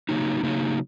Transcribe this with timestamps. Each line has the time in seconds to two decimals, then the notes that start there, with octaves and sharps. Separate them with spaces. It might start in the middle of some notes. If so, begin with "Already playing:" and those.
0.09 C#3 F#3 A#3 D#4
0.43 C#3 F#3 A#3 D#4